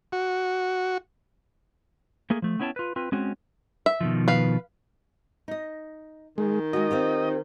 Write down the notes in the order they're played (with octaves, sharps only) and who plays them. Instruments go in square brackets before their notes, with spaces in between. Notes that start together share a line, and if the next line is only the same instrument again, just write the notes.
[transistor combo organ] F#4
[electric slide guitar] A3 A#3 G#4
F3 A3
B3 C#4 E4 C#5 G5 A5
F4 B4
C4 F4 B4
G#3 C4 C#4 F#4
[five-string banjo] E5
[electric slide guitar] B2 D#3 F3
[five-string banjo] B4 F5
[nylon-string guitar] D#4 D#5
[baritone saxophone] D#3 [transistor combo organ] G#3
[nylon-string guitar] G#3 F#4 [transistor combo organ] D#5
[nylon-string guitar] C4 F4 G4